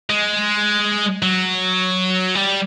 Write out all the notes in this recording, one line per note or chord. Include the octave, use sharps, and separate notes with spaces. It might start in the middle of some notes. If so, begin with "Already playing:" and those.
G#3
F#3
G3